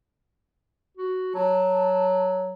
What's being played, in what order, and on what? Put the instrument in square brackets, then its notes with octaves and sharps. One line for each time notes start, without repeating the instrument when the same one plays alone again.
[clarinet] F#4
[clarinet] F#3 [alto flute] A5